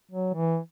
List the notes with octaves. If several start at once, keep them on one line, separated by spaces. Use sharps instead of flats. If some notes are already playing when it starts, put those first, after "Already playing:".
F#3
E3